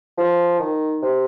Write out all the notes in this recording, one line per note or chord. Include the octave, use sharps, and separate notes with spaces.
F3
D#3
C3